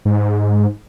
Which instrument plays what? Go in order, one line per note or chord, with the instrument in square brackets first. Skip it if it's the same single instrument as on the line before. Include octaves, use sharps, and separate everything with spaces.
[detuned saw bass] G#2